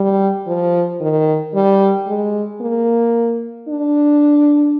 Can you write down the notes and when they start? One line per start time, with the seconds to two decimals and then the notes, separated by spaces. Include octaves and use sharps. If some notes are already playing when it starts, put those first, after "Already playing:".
Already playing: G3
0.46 F3
1.01 D#3
1.54 G3
2.07 G#3
2.61 A#3
3.68 D4